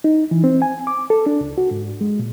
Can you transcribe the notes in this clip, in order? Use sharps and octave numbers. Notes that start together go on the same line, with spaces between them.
D#4
E3
C4
G#5
D6
A4
D4
C#2
F#4
G#2
G#3
A#2